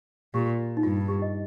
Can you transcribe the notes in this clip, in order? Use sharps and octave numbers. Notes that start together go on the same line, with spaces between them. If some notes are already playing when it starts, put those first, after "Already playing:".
A#2 G4
D#4
G2 F4
G4
D#5